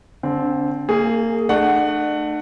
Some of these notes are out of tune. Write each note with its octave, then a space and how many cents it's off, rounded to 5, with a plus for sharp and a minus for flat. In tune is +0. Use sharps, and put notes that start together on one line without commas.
D3 -25 C4 +0
A#3 -30 G#4 +0
A3 +10 D4 +45 F#5 +0